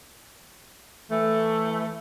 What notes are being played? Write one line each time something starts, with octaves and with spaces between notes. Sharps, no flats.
E3 A3